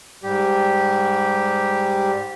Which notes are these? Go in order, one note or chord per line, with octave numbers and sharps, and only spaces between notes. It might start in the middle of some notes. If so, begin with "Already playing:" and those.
G#2 G3 G4